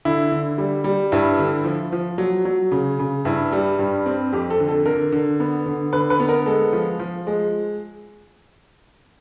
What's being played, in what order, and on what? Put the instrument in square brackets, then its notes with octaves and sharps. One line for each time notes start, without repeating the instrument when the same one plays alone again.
[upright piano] D3 E4
D3
G3
G3
G2 E4
D3
F3
F3
F#3
F#3
C#3
C#3
G2 E4
G3
G2
C4
F2 G4
A4
D3
A4
D3 A#4
D3
B3
D3
D3 B4
B4
B3
A#4
G#3 A4
F3
F3
G#3